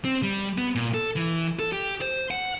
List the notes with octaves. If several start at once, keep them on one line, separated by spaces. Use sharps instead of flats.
C4
G3
B3
A#2
A4
E3
A4
G4
C5
F#5